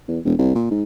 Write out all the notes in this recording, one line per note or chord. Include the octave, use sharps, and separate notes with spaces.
E2
E1
C2
A#2
G#2